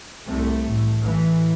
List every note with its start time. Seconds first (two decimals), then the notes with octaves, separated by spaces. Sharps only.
0.27 C2 C3 A3
0.65 A1 A2
1.02 A1 A2 E3